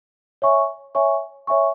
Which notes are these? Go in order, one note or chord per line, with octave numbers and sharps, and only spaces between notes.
C#5 E5 G#5 C#6
C#5 E5 G#5 C#6
C#5 E5 G#5 C#6